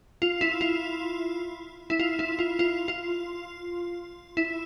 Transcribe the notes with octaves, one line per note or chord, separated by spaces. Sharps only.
F4
E4
F4
E4
F4
E4
F4
F4
F4
E4